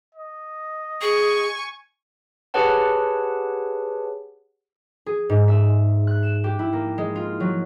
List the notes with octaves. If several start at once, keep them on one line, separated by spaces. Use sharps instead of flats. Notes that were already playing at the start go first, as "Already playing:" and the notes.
D#5
G#4 G#5 C#6
G4 G#4 B4 C#5 F#5 A5
G#4
G#2
E5
F#6
E7
G4
E4
A#3
G#3
F4
F#3